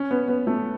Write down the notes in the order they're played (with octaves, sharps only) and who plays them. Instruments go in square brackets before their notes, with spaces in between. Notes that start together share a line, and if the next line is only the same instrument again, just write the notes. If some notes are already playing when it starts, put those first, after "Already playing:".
Already playing: [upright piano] C#4
B3
B3
A3